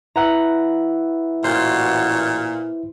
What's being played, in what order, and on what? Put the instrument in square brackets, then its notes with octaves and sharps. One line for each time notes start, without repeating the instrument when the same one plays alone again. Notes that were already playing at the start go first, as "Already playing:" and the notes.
[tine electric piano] E4 B4 E5 [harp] F#5 A#5
[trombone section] A1 F#4 [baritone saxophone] A#2 [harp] C5